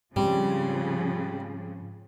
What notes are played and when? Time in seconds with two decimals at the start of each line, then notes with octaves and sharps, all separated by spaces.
0.16 G#2 C#3 F3 G3 C4